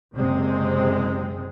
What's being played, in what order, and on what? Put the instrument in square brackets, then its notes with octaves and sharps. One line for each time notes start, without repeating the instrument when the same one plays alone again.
[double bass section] F#1 F#2 C3 G#3 C4